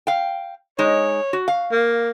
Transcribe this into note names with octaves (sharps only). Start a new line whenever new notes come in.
F5 G5
G#3 D#4 C#5
F#4
F5
A#3